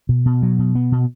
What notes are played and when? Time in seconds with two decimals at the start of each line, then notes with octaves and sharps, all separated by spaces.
0.09 B2
0.26 B2
0.42 F#3
0.59 B2
0.75 B3
0.92 B2